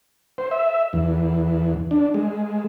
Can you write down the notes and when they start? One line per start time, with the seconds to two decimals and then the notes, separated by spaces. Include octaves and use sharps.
0.38 C5
0.51 E5
0.93 E2
1.91 D4
2.14 G#3